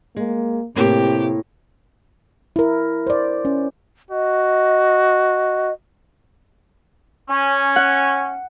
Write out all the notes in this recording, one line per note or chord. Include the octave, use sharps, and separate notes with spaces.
G#3 A#3
A2 C3 A#3 C4 G4
E4 A#4
C5 D5
C#4
F#4 D#5
C#4
F#5